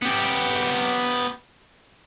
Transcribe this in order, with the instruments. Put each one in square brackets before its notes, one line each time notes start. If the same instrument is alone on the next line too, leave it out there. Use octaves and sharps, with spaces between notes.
[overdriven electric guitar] B3 G4